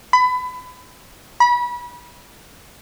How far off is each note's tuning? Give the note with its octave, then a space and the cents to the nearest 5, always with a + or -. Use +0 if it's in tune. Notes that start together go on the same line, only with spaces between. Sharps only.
B5 +25
B5 -30